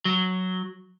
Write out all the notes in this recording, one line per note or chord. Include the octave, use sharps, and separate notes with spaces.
F#3